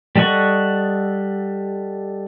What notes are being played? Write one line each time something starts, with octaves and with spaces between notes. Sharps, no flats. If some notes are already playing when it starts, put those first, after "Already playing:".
G3 A4 D#5 F#5 C#6